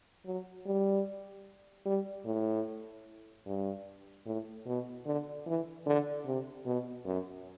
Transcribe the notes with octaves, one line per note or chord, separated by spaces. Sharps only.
F#3
G3
G3
A2
G2
A2
B2
D3
E3
D3
C3
B2
F#2